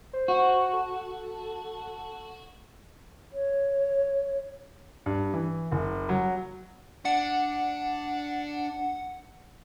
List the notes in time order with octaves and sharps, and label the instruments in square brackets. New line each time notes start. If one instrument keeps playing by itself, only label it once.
[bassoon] C5
[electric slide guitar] F#4
[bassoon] A4
[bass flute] C#5
[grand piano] G2
E3
F#1
F#3
[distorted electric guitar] D4 [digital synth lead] F#5